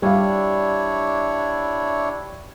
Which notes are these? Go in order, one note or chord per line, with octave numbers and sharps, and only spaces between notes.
G3 D4 E4 C#5 F5